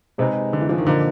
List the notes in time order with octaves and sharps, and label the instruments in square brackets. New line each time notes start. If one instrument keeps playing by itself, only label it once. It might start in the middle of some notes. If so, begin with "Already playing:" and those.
[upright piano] C3 [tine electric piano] G#3 C4 D#4 G#4 B4
[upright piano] D3
E3
F3
D#3
[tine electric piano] A#2 F3 A#3 D#4 [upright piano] D3